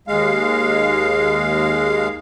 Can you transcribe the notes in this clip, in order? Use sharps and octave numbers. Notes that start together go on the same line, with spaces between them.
D#2 G#3 F5